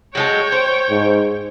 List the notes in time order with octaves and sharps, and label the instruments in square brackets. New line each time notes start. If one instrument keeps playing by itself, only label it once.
[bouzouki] F#3 G#3 A4 [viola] C#5 G5
[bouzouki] C5
[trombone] G#2